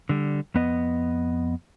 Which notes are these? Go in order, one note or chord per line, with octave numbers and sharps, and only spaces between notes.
D3 G3
F2 B3 D#5